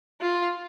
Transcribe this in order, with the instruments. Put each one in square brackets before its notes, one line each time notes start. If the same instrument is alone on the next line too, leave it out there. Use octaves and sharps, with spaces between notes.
[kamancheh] F4